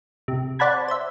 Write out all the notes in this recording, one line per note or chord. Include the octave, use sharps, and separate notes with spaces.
C3
C5 D5 F#5 A5 B5 G#6
C5 E5